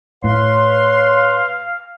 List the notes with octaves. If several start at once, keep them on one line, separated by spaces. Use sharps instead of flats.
A2 B4 C#5 F5 C6